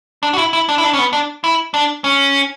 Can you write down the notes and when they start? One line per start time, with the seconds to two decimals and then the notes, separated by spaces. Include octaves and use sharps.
0.23 D4
0.33 F#4
0.38 E4
0.53 E4
0.69 D4
0.78 E4
0.84 D4
0.93 C#4
0.98 B3
1.13 D4
1.44 E4
1.74 D4
2.04 C#4